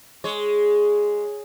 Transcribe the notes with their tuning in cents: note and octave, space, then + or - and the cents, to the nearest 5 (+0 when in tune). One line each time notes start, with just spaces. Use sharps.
G#3 +0 C#5 +0